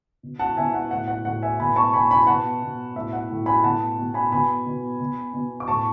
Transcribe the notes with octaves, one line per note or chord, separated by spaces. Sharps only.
B2
F#5 A5
B2 E5 G#5
F#5
A2 F#5
F#5
A2 F#5
E5 G#5
B2 G#5 B5
A5 C#6
B2 G#5 B5
G#5 B5
B2 F#5 A5
B2
A2 E5
F#5
A2
G#5 B5
B2 F#5 A5
B2
G#5 B5
B2 G#5 B5
B2
B2
B2
D6
A2 A5 C#6